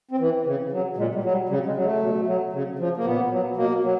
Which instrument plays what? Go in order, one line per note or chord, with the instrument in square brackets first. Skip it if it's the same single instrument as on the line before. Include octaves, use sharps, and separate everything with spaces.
[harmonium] C4
E3
C#3
F#3
A#2 G#3
G3
F#3
G3
C#3 G3
G#3
F#3
A3
B2
F#3
C#3
F3
A#3
A#2 B3
F#3
B2 A#3
F#3